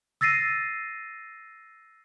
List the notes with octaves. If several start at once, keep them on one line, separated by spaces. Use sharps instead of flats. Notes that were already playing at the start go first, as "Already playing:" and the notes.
E6 A6 A#6 C7 D#7